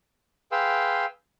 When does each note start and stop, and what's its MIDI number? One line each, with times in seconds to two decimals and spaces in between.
0.52 1.05 68
0.52 1.05 71
0.52 1.05 77
0.52 1.05 79
0.52 1.05 84
0.52 1.05 88